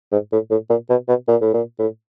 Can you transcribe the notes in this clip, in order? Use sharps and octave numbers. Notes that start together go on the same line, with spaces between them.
G#2
A2
A2
A#2
B2
B2
A#2
A2
A#2
A2